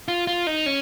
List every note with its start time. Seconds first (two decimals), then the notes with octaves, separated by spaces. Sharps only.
0.08 F4
0.27 F4
0.47 D#4
0.66 C#4